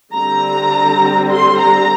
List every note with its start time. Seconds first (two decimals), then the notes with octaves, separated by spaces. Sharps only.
0.13 D3 G3 C4 A#5
1.31 C6
1.60 A#5